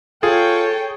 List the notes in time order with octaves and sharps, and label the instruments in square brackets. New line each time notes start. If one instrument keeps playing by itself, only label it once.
[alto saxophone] F4 [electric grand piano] G#4 [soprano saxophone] A4 [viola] C#5 G5